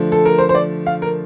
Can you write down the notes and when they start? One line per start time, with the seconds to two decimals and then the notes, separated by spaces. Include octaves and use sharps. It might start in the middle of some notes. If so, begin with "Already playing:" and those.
Already playing: D3 F3 A3
0.12 A4
0.25 A#4
0.38 C5
0.49 C5
0.55 D5
0.87 F5
1.02 A#4